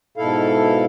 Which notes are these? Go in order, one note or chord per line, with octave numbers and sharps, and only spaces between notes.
G#2 B2 E4 A4 F5